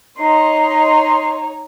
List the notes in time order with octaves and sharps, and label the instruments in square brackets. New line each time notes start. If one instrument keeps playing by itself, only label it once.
[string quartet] D#4 C#5 [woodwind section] D#5 C6